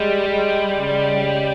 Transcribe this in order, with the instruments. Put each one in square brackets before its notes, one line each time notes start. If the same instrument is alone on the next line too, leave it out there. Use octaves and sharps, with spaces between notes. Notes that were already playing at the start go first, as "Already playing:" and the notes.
Already playing: [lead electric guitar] G3 [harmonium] G#3
[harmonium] G#3
C#3